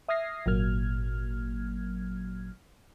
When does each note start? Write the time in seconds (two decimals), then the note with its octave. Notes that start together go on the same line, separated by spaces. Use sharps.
0.09 E5 D#6 F6 G#6 A#6 C7
0.46 G#1 A#2 F#3 A#3 F6 G#6